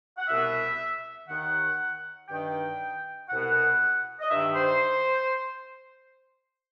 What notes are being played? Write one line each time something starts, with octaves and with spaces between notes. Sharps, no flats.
F#5
C2 B2 E5
D#2 D#3 F#5
G2 D#3 G5
C2 B2 F#5
D#5
G2 D#3 E5
C5